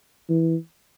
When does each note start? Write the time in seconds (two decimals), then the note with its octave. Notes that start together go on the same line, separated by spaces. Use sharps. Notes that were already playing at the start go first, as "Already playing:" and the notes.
0.29 E3